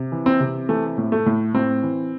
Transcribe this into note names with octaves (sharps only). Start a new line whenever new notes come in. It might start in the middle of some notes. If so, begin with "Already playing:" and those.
Already playing: C3
E3
C4
C3
E3 A3
A2
A3
A2
A2 C4
E3